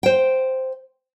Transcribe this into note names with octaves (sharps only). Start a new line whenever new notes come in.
C5 G5